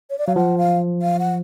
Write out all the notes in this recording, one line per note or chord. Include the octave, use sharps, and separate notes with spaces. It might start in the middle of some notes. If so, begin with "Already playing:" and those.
C#5
D5
F#3 F5
F3 F#5
F5
F5
F#5